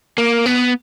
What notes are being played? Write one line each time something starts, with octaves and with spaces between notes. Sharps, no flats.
A#3
B3